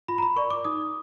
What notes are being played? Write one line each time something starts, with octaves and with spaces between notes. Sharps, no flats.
F4 B5
A#5
B5
A#4 D5 C#6
D6
D#4 D#6